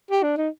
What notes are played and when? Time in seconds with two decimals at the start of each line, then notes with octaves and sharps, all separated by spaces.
0.11 G4
0.23 D4
0.37 D#4